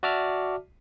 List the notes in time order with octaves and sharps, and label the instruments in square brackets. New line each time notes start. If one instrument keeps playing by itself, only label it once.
[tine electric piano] F#4 D5 E5 A5 D6 F6